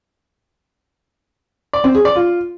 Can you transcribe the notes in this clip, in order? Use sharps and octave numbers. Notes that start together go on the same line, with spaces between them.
D5
C4
G#4
D5
F4